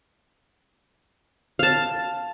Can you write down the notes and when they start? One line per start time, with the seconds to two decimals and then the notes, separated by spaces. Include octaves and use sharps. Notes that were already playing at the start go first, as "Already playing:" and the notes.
1.59 F5 A5